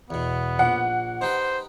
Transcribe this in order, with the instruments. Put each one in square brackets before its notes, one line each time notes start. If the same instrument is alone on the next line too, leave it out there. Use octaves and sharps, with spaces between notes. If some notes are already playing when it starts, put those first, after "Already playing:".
[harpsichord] E2 B2 [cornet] B3
[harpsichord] A#1 [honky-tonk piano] F#5
[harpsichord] D#4 G4 B4 [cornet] C5